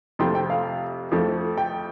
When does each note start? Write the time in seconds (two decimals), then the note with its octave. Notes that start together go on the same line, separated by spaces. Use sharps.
0.19 F2 C3 F3 A3 G5 C6
0.35 G5
0.50 F5
1.11 F2 F3 A3
1.58 G5